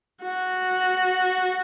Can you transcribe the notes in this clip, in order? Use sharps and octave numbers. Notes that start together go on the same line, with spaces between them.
F#4